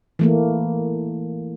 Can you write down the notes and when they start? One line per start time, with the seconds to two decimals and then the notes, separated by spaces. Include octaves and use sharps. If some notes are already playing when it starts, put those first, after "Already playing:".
0.19 E3 A3 A#3